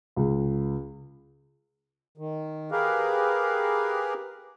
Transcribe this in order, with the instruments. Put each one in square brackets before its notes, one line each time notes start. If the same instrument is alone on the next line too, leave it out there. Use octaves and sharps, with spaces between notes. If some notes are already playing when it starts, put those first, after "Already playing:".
[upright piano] C#2
[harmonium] D#3
G4 G#4 A#4 B4 F5